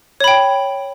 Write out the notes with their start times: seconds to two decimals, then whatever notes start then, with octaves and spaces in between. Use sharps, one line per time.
0.20 C#5
0.24 B5
0.28 G5